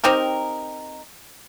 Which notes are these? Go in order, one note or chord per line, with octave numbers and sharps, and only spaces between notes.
C4 D#4 G4 A#4